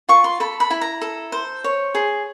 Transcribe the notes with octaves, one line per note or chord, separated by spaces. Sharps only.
F4 C#6
C6
A4 B5
B5
E4
A#5
A4
C5
C#5
G#4